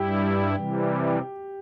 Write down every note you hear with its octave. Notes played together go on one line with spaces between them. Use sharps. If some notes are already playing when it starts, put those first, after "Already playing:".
Already playing: G2 G3 E4 G4
C3 E3 G3